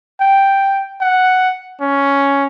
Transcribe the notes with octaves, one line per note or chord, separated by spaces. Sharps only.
G5
F#5
C#4